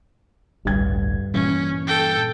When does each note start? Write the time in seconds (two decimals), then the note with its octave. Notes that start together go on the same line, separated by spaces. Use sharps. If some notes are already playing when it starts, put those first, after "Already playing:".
0.65 A1 D2 G2 G#6
1.34 A#2 E3 G3 C#4
1.87 A4 G5